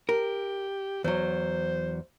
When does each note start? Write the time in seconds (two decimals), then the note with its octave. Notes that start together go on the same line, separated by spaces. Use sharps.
0.09 G4 A#4
1.04 E2 F#3 C5